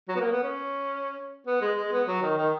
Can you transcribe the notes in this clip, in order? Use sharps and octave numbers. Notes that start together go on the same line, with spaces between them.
F#3
B3
A#3
B3
C#4
B3
G#3
G#3
B3
F#3
D#3
D#3